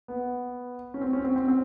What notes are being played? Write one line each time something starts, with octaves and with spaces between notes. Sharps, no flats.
B3
C#4
C4
C#4
C4
C4
C4